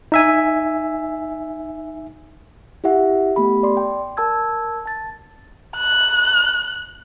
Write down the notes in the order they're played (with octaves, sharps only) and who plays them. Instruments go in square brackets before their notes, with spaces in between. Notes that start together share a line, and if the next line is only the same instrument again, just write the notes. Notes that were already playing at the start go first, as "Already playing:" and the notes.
[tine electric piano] D#4 E5 G#5
[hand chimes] E4 G4 E5 F#5
A3 B3 G4 B5
D5 C6
G5
A#4 A5 E6 G#6
A5 A6
[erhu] F#6